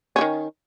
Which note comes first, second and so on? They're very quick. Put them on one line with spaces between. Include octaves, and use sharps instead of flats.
C#4 E3 D#3